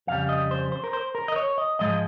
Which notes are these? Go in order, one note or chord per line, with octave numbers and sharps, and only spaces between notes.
F2 C#3 G3 F5
D#5
C5
C5
A#4
C5
A#4
D#5
C#5
D#5
G#2 F3 G#3 D#5